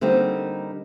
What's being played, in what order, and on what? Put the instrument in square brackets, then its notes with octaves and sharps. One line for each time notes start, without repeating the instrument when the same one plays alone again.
[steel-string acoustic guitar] D3 G3 A#3 C4 D#4